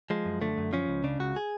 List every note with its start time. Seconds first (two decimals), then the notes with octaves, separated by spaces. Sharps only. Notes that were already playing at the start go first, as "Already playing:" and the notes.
0.10 F3 G#3
0.26 F#2
0.41 D3 A3
0.58 F#2
0.73 F3 C#4
0.89 C#2
1.04 C#3 D4
1.20 C#2 F#4
1.36 G#4